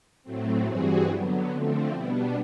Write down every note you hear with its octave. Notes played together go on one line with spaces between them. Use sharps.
A2 F#3 A3 C4
G2 E3 G3 C4 F#4 G#4
D3 F#3 B3
D3 F3 A3 C4
B2 G3 B3 D4 E4